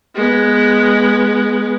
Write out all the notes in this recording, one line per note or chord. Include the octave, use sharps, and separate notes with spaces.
G#3 B3